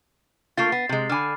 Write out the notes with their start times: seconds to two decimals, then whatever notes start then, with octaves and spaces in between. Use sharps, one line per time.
0.57 A3 A#3 F4 A6 C7
0.72 B3
0.89 C3 G#3
1.09 D3 G#5 B5 D6 F6